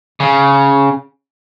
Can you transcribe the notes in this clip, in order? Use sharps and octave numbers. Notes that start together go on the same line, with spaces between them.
C#3